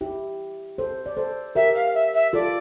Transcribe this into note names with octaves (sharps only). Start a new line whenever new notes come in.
E4 G4
A4 C5
D5
A4 C5
G4 A#4 E5
F5
E5
E5
F4 A4 D5